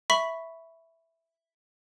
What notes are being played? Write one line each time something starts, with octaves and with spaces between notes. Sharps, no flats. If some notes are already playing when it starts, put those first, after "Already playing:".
E5 B5 C#6 B6